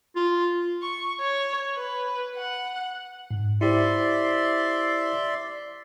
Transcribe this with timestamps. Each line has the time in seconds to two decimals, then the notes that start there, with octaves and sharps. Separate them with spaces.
0.16 F4
0.82 C#6
1.21 C#5
1.76 B4
2.36 F#5
3.31 G#2
3.61 E4 G4 C5 D5 E5 C6